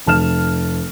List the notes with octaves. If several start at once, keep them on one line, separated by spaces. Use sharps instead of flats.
F1 A5 F6 E7